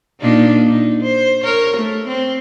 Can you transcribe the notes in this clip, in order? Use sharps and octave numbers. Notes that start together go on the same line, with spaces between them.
A#2 D4 D#4
D#4
C5
A#4 C#5
A3
C4